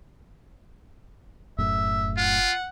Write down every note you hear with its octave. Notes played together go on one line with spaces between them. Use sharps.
F1 F#2 A2 E5
F4 F#5